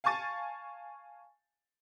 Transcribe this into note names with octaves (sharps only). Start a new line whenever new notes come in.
F5 G#5 A5 C#6 A6 D#7